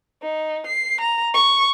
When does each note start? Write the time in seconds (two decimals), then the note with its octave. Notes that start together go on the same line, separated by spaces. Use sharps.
0.22 D#4
0.66 C7
1.01 A#5
1.34 C#6